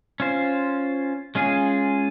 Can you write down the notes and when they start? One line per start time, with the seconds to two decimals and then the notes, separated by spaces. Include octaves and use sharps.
0.20 C#4 F4 C5
1.35 G#3 C#4 F4 G#4